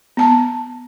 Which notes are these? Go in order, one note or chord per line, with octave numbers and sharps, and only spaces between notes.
B3 A5